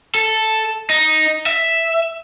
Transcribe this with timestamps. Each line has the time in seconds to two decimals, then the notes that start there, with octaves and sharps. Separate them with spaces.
0.15 A4
0.90 D#4
1.46 E5